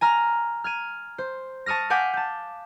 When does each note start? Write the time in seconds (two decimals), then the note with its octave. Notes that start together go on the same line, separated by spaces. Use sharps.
0.01 G#5 A#5 F6
0.64 F6 G#6 D#7
1.18 C5
1.66 A5 C#6 D#6 F6 A#6
1.90 F5 F#5 G#5 D6 G6 B6
2.14 A5 G6